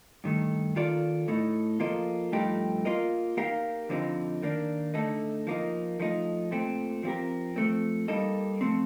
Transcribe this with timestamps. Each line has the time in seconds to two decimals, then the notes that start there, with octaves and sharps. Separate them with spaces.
0.24 G2 D#3 A3
0.76 D#3 A#3 F4 A4 D5
1.28 A2 A3 D#4
1.80 F3 A#3 F4 A4 D#5
2.32 G2 F3 A3 D#4 G4
2.85 A#3 F4 A#4 D#5
3.37 A#3 D#4 G4 A#4 F5
3.89 F2 D3 F3 C4 D#4
4.42 D#3 A#3 D4
4.94 D3 A3 D#4 A4
5.47 F3 A#3 D#4
6.00 F3 A3 D#4
6.51 A#2 A3 C4
7.03 F3 C4 G4 A#4
7.56 F3 A3 C4
8.08 G3 A#3 D#4 A4 D#5
8.61 F3 A3 C4